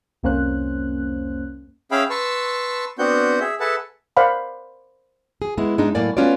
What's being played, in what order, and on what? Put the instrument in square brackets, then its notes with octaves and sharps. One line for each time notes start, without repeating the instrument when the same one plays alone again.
[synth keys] C2 F2 A#3 C#4 C5 F#6
[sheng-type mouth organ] C#4 G#4 E5 F5 G5 B5
B4 A5 C6 C#6 E6
B3 C4 D4 F#4 F#5 G6
G#4 E5
G#4 A4 B4 E5 F#5 A5
[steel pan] A#4 C5 D5 F5 F#5 B5
[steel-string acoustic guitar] G#4
G#3 B3 E4
G#2 G#3 D4 D#4
A2 F#3 A#3 D5 G#5
A3 B3 C#4 F4 F#4 D5